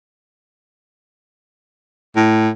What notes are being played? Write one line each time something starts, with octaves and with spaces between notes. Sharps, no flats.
A2